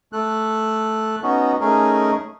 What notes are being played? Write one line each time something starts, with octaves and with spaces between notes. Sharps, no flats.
A3 A4 F#6
B3 C#4 D#4 F#4
A3 C#4 D#4 G#4 A#4